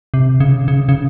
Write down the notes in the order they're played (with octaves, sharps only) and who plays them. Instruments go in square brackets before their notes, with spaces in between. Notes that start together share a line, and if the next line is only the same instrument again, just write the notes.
[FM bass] C3
C#3
C#3
C#3